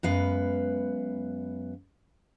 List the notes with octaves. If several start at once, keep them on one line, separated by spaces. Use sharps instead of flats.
F#2 G#3 B3 B4 F5